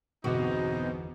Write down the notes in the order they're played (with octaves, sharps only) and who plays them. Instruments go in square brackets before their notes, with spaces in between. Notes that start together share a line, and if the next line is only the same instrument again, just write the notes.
[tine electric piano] G1 E2 D6 [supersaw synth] B2 [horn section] C4 D#4 [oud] F#4